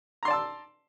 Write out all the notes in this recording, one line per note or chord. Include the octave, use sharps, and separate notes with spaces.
D5 A5 A#5 C6 E6